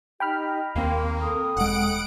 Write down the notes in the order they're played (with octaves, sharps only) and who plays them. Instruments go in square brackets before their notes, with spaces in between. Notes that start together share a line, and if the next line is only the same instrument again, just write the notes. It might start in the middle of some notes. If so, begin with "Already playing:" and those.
[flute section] D#4 G4 D#5 [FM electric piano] G5 B5 F6
[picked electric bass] D#2 C4 [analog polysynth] A#3 [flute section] C6
[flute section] A4 D#6
[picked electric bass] E1 G#3 [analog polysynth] F#5 D7